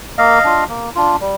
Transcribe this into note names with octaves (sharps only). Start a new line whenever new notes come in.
A#3 D#5 F5
D4 F4
A#3
D4 F4
G3